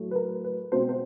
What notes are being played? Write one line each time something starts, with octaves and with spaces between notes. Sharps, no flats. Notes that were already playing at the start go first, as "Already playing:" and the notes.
Already playing: A2 F#3 A3
B4
A#4
B4
B2 G#3 C4 C5
C5